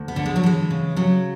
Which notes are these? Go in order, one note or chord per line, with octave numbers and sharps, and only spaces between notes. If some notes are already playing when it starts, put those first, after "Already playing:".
Already playing: D2
B3
D3
G#3
F#3
E3 G#3
C#3
C#3 F#3